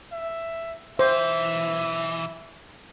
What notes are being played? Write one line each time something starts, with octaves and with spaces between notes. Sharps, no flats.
E5
B1 E3 C5 E5